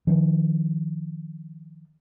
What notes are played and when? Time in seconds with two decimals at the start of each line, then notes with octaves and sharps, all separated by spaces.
0.07 D#3 F3